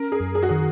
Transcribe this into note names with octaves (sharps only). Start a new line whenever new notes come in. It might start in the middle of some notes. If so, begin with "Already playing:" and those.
Already playing: C#4 A#4
G#4
F#2
G#4
F#4
D#3 G#4